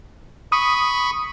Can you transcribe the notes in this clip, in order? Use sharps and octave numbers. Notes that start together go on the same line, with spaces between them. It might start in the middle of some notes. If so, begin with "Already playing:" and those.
B5 C#6 D#6